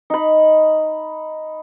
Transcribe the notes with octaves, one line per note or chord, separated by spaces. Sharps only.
D#4 B5